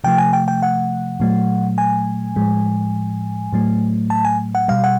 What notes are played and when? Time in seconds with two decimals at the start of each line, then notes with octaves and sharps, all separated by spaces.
0.04 C3 F3 A3 G5
0.18 G#5
0.33 G5
0.48 G5
0.62 F#5
1.20 A#2 F#3 A3
1.78 G#5
2.36 A2 F3 G#3
3.53 A2 F#3 A3
4.10 A5
4.25 G#5
4.55 F#5
4.68 B2 G3 F5
4.84 F#5